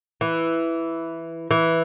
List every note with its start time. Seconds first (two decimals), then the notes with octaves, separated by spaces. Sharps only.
0.21 E3
1.51 E3